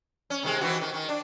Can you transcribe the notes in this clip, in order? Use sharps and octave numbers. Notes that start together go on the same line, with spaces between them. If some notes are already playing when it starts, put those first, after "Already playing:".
C#4
C3 D#3 G#3
D#3 E3 F#4
D#3
D#3
D4